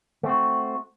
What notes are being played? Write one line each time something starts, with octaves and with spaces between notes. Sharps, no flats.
A3 C4 F#4